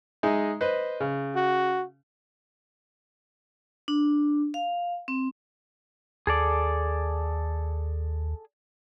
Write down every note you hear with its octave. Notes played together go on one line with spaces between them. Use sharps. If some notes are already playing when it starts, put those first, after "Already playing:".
G#3 D#4 E5
B4 C5 D#5
C#3
F#4
D4
F5
C4
D#2 G#4 A4 D5